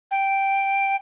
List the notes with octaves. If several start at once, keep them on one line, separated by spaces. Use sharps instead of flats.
G5